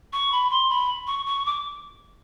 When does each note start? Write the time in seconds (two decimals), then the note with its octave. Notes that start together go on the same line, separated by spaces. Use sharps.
0.12 C#6
0.32 B5
0.50 C6
0.69 B5
1.07 C#6
1.26 C#6
1.45 D6